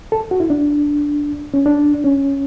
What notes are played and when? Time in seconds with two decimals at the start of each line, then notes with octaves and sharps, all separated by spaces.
0.12 A4
0.31 F#4
0.40 E4
0.50 D4
1.54 C#4
1.66 D4
2.04 C#4